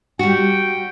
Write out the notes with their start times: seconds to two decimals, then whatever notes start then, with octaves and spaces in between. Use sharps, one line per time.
0.19 G3 F#4 G5